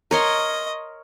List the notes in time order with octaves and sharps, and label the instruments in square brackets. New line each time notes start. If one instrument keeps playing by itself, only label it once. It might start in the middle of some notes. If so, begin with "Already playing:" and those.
[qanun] A#4 C#5 C6 [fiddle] D#5